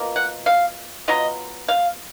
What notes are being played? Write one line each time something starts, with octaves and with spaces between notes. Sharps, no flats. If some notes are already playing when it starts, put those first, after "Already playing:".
Already playing: B2 A#3 F4
F#5
F5
F#3 B3 F4 D#5
F5